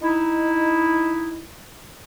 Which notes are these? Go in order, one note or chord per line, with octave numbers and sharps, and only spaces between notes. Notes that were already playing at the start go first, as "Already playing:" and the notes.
D#4 E4